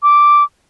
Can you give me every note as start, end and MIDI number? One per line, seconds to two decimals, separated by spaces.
0.03 0.44 86